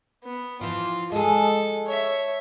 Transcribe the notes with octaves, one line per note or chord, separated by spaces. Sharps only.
B3
E3 F3 F4
G#3 G#4 A4
C#5 E5